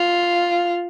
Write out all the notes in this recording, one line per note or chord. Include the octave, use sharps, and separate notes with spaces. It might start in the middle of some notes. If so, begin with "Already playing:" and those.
Already playing: F4